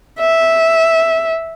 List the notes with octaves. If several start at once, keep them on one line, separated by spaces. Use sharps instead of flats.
E5